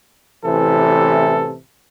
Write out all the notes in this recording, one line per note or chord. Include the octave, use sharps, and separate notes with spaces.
A1 C3 E3 A4